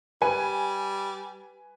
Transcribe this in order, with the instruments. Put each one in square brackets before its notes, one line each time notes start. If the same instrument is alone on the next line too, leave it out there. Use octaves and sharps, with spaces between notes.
[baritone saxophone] G3 [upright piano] B4 G#5